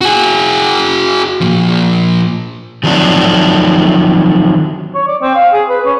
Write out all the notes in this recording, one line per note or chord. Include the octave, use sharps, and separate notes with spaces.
F#4 G#4
A#2 F3
D#3 F3 F#3 C4 D4
C#5
D5
C4
F5
G#4
B4
C#4